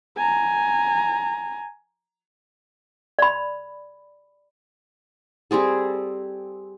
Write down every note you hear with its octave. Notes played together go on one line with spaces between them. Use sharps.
G#5 A#5
D5 B5
G3 C4 G#4 A4